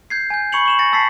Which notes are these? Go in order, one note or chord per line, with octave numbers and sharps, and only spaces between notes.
G6 G#6 C7
G#5 G6
B5 C#6 G#6 C#7 F7 F#7
C#6 E7 F7
G#5 A6 A#6 C#7
A5 E6 A6 B6 C7